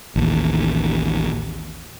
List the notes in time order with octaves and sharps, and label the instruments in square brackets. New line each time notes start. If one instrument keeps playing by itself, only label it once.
[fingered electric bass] A1 D#2